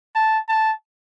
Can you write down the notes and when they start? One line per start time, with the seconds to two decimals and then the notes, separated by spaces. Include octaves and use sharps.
0.15 A5
0.48 A5